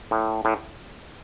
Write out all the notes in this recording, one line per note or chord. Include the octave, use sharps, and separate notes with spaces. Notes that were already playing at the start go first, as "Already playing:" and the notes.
A2
A2